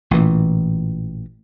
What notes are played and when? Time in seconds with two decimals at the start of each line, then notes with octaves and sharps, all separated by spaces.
0.11 A1 A#2 E3